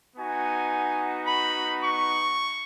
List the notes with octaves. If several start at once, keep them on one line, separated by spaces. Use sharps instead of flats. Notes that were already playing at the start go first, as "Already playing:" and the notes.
B3 D#4 F#4 G#5
B5
C#6